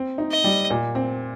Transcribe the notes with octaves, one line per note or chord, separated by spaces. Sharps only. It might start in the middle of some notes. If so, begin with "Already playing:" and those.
Already playing: C4
D#4
D#5
G3
A#2
C4